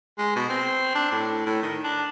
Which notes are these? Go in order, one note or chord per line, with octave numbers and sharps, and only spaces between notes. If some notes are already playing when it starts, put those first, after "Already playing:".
G#3
B2
C4
D4
A2
A2
D#3
D4